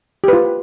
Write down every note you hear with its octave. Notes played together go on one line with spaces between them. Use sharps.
F4 G4 B4